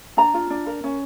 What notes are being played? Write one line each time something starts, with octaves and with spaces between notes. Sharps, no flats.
D4 A#5
F4
D4
A#4
C#4